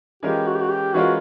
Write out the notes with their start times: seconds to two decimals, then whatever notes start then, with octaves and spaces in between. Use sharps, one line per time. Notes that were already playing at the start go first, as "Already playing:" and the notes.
0.23 E3 G#3 C#4 F4 G4 A#4
0.47 F#4
0.55 G4
0.62 F#4
0.70 G4
0.93 E3 G#3 C#4 F4 F#4 A#4